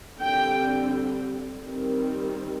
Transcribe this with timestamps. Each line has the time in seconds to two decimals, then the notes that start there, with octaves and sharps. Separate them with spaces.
0.20 D3 G3 C4 G5
1.65 D#3 G3 C4